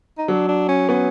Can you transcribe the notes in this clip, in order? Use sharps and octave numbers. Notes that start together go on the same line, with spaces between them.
D#4
F#3 D4
D4
C#4
B3 C#4